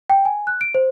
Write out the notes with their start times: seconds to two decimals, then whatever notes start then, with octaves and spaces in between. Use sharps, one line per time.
0.10 G5
0.25 G#5
0.47 F#6
0.61 D7
0.75 C5